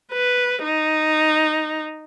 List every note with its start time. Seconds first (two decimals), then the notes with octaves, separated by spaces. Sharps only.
0.12 B4
0.63 D#4